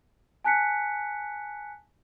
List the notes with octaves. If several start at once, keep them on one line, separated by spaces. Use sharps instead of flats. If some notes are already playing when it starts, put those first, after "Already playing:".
G#5 A5 F#6 B6 C#7